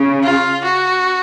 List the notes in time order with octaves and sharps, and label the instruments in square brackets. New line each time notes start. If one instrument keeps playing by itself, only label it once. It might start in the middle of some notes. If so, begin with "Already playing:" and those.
Already playing: [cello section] C#3
[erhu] F4
F#4